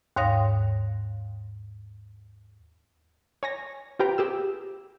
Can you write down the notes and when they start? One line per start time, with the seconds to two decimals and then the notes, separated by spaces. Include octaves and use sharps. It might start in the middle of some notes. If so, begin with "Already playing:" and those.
0.16 D#2 G#2 C#5 F5 D#6 A#6
3.43 C#5 G#5 A#6
3.99 F4 G4 B4 C5 G5 A#5
4.18 G4 G#4 E6